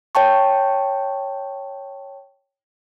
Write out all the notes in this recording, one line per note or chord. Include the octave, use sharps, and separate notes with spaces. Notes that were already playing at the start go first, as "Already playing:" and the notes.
C#5 G5 A5 C#6